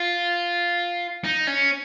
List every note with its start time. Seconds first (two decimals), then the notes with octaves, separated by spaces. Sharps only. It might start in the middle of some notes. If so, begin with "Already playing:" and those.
Already playing: F4
1.24 D#4
1.47 C#4